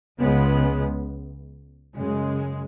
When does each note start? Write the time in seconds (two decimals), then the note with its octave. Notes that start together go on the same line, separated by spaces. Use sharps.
0.19 C#2 C#3 G#3 B3
1.95 F#2 C#3 G#3